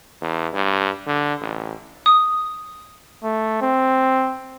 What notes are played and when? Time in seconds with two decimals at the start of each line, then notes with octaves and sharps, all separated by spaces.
0.21 E2
0.53 G2
1.07 D3
1.41 A1
2.06 D#6
3.24 A3
3.62 C4